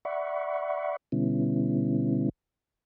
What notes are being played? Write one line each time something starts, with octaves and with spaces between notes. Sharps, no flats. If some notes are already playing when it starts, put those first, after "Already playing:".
D5 E5 F#5 B5 C#6
B2 D3 G3 B3 C#4 E4